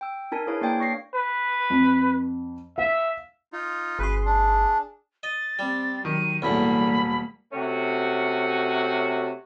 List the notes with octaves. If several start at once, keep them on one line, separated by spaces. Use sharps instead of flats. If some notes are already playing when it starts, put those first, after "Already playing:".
G5 E6
D4 D#4 A#4 G#5
E4 G#4 B4 C#5 F5
A#3 D4 D5 F5 G5
C#5 C#6 A#6 C7
B4
F2
E5 F5
D#4 F4
G1 G#4 B4 C6
D4
D#5 A6
G3 C4
D#3 F#3 D#7
E1 E2 A2 G3 A#3 B5
C3 A3 C#4 F#4